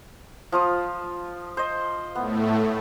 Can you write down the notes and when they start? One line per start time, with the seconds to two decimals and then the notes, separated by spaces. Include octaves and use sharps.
0.52 F3 F4 D#6
1.57 C5 D#5
2.15 A2 A3 B3